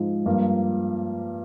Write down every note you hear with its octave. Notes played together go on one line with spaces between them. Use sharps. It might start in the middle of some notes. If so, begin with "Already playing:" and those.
Already playing: G#2 F3 G#3
G2 F3 A#3